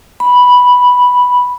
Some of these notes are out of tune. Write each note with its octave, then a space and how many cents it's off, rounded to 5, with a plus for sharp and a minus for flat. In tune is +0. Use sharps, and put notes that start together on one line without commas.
B5 -5